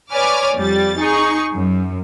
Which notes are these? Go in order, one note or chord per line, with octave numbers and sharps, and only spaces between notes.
B4 C#5 D5 G#5 D6 F6
F2 G3 A6
D#4 G#4 C#6
F#2